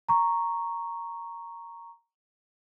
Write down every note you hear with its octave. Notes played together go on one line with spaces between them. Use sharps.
A#5 C#6